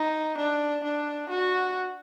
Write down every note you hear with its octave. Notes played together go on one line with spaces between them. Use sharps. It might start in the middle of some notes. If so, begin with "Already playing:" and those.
Already playing: D#4
D4
D4
F#4